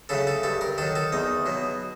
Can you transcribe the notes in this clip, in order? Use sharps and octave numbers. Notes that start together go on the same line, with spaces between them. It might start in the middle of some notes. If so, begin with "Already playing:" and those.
C#3 F#3 A3 A4
A4
G2 A4
A#4
D#3 F#3 A4
A4
E2 D#4
B2 F#3